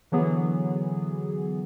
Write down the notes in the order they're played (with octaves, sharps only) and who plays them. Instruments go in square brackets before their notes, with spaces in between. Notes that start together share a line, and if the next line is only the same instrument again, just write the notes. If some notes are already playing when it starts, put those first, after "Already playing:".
[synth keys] D3 E3 F#3 B3 G#4